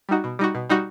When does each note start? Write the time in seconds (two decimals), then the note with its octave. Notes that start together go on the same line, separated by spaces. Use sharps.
0.09 G3 D#4 F#4
0.24 B2
0.39 G3 D#4 F#4
0.55 B2
0.70 G3 D#4 F#4